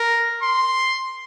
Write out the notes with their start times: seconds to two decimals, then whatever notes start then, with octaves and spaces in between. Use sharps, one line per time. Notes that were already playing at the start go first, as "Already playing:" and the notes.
Already playing: A#4
0.43 C6